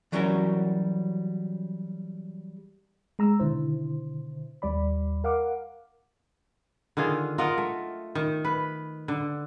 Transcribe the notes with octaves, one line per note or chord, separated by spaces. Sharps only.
E3 F#3 G3 C#4 F#4 A#4
G#3 A#5 E6
B2 D3 D#3 E4 C5
D#2 G3 D5 B5
A#4 F5 F#5 D6
D3 D#3 F4 G#4
F4 A#4 D#5 F#5
A3
D#3
B4
D3